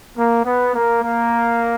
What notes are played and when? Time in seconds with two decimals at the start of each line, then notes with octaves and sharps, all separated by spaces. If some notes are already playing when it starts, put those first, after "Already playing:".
0.16 A#3
0.45 B3
0.74 A#3
1.03 A#3